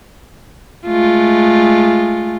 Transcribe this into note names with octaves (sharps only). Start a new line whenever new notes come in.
G#3 A3 F4